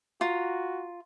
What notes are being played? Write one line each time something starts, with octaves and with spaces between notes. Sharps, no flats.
F4 F#4 A#5